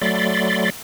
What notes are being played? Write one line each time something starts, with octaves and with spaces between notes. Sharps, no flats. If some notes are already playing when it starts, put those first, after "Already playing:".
F#3 A3 D5 B5 C6 A6